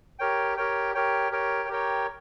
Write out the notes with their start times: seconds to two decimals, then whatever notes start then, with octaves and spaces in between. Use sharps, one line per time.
0.19 G4 A#4 C#5 G5
0.57 G4 A#4 C#5 G5
0.94 G4 A#4 C#5 G5
1.32 G4 A#4 C#5 G5
1.69 G4 A#4 C#5 G5